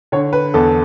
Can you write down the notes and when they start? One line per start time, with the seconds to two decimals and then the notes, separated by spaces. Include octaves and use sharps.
0.12 D3 C#5
0.33 B4
0.54 E2 A4